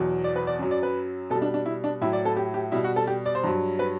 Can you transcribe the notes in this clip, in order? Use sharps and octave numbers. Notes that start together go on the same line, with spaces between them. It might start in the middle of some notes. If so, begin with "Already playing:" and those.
Already playing: E2 B2 F#3
D5
B4
D5
F#2 F#3
D5
B4
B2 G3 A4
D4
D4
E4
D4
A2 F#3 E4
D5
A4
G4
G4
B2 G3 E4
F#4
A4
G4
D5
C5
G2 F#3
B4